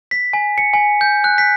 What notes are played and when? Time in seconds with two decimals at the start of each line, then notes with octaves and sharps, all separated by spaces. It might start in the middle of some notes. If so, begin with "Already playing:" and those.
0.11 B6
0.33 G#5
0.58 C#7
0.73 G#5
1.01 G6
1.24 F#6
1.38 B6